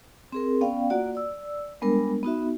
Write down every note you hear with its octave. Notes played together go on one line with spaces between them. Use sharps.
C4 G#4 A#4
B3 C#4 D5 F5 G5
A#3 F4 F#4 D5 F#5
D5 E6
G3 G#3 B3 D4 A#4
B3 D#4 F#4 E5